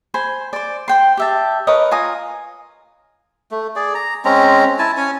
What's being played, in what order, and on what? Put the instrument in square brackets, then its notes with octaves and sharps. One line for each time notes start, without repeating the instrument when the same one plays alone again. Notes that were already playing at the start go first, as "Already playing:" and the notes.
[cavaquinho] C5 G#5 B5
C5 D5
C5 G5 C6
G4 E5 A5
A#4 B4 C#5 D#5
F4 G#5 A#5 D#6
[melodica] A3
G#4 D5
A#5
G#3 C4 C#4 A#5
E4 G#5 A5
C#4 C#5 G#5